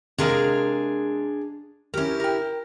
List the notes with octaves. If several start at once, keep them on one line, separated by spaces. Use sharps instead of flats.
C3 G#3 D4 G#4 A#4 F5
C#4 E4 G4 A#4
A#4 G5